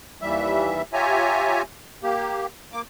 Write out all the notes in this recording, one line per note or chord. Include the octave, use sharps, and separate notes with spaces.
D#2 E3 G3 E5
F4 G4 C#5 E5 G#5 A#5
A#3 G4
A#3 D6